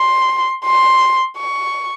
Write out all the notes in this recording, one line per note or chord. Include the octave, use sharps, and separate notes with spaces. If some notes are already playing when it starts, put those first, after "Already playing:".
Already playing: C6
C6
C#6